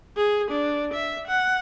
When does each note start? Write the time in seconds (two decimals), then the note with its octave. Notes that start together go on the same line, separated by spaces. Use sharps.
0.17 G#4
0.51 D4
0.93 E5
1.27 F#5